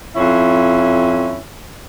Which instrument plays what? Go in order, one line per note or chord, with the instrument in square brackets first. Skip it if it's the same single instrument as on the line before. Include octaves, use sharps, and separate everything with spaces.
[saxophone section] F2 C#4 E4